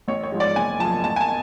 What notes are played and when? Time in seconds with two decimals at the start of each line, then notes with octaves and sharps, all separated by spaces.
0.08 A1 C#5
0.23 C#5
0.32 G#2 F3 G#3
0.40 D5
0.56 F#1 G#5
0.80 F#2 F3 A5
1.04 A1 A5
1.16 G#5
1.21 A5